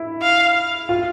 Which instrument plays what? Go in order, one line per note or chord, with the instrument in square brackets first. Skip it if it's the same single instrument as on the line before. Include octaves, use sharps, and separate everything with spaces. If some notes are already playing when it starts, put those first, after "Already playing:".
Already playing: [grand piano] E4
[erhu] F5
[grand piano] F4